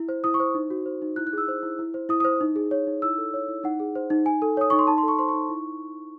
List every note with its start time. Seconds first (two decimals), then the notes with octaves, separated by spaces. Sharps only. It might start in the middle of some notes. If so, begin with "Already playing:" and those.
Already playing: E4
0.09 C5
0.24 E4 D#6
0.34 C#6
0.40 C5
0.55 D#4
0.70 F#4
0.86 C5
1.02 D#4
1.16 E4 F#6
1.27 F#6
1.33 G#4 E6
1.48 C5
1.63 E4
1.79 E4
1.94 C5
2.09 E4 D#6
2.20 C5 D#6
2.41 D#4
2.56 G#4
2.71 C#5
2.87 D#4
3.02 E4 E6
3.18 A4
3.34 C#5
3.48 E4
3.64 D#4 F#5
3.80 G#4
3.95 C5
4.10 D#4
4.26 D#4 G#5
4.42 A4
4.57 C#5 D#6
4.70 D#4 C#6
4.79 C6
4.87 D#4 A5
4.98 C6
5.03 A4
5.08 C#6
5.19 C5 C6
5.29 C#6
5.34 D#4
5.49 E4